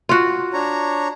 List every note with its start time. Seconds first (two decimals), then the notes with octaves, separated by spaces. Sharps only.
0.09 F4 F#4
0.54 D4 C#5 A#5